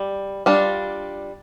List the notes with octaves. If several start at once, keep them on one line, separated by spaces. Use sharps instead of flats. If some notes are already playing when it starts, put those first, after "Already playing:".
Already playing: G3
G3 D4 F4